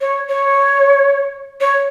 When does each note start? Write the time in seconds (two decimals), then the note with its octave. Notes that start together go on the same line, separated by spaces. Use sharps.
0.01 C#5
0.28 C#5
1.60 C#5